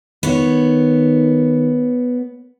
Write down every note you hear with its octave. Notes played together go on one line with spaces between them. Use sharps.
D#3 B3 C#5